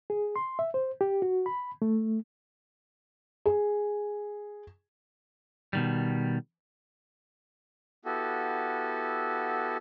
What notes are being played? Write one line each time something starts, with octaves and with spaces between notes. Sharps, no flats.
G#4
C6
E5
C5
G4
F#4
B5
A3
G#4
B2 D#3 G3
B3 E4 F#4 G4 A4